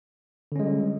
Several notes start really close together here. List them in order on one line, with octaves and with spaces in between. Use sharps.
D3 C#4 G#3 G3